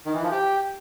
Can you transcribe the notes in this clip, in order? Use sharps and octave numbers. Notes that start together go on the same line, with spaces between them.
D#3
E3
F3
G4